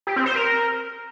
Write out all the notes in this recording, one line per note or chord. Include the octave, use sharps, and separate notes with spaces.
G4
C4
C5
A#4